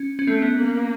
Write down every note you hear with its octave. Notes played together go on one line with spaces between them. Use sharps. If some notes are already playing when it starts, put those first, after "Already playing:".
Already playing: C#4
C#4
A3 C4
B3
A#3